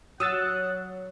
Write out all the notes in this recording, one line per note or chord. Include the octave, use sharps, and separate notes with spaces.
F#3 F#5 D#6 E6 A6